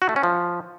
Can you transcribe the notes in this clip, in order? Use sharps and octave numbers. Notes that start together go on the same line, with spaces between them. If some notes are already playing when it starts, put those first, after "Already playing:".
F#4
A3
C#4
F3